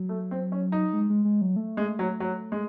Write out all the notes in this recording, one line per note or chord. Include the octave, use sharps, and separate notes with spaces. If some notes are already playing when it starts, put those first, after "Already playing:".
Already playing: F#3
A3
C4
C#4
D#4
G#3
G#3
G#3
F#3
A3
G#3
F#3
F#3
G#3